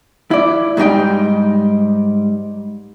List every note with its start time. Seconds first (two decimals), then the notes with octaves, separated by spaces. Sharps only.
0.31 E4 D5
0.77 G#2 G3 D#4 G5